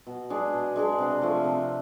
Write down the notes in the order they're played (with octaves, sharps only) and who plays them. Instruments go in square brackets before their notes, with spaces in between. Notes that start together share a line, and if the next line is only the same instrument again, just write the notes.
[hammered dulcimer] B2
G#3 D4 G#4
B2
G#3 D4 G#4
C3
F3 A3
C3